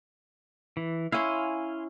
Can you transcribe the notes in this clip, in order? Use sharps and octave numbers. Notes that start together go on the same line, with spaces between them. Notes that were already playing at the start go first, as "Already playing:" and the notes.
E3
C#4 E4 F5 G#5 C6